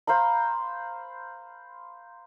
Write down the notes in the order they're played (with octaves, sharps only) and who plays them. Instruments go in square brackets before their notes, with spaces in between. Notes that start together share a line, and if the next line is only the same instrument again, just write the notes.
[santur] C5 F5 A#5 B5